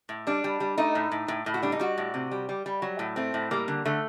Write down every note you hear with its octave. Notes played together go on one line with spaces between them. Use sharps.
A2
G3 D4
G3
G3
A3 D#4
A2
A2
A2
A2
F#4
G3 D4
D#4
G3 F#4
A2
C3
G3
G3
G3
F#3
A2
A3 C4
A2
G3 A#3
D3
D3 A3